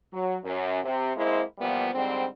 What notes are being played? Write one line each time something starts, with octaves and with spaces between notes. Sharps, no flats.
F#3
F#2
C3
G#3 A#3 C4 E4 C5
A#2 E3 F3 G3 B3
G#2 D3 G3 C4